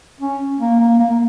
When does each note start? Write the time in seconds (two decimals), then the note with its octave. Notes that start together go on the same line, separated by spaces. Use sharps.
0.20 C#4
0.59 A#3
0.79 A#3
0.99 A#3
1.10 A#3